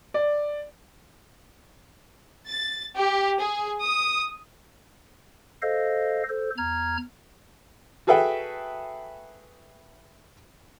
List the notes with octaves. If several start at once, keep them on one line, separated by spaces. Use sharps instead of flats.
D5
A6
G4
G#4
D#6
A4 C5 D#5 F5
A4 C5
E2 A#5 F6 G#6
F#4 G#4 A4 B4 E5 G5